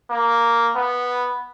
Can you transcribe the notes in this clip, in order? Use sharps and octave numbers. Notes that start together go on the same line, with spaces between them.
A#3
B3